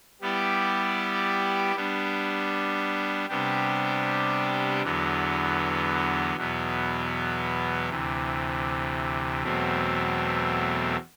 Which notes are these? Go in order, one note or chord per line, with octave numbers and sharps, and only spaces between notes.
G3 B3 E4 G4 D5
G3 B3 D4
C3 G3 B3 D4 G4
E2 D3 F#3 B3
E2 B2 F#3 B3
D2 C3 E3
E2 B2 F#3 A3 C4